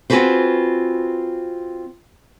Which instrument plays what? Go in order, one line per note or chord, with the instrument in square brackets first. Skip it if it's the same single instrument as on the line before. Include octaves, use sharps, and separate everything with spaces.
[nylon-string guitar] C4 F4 F#4 G#4 B4 C5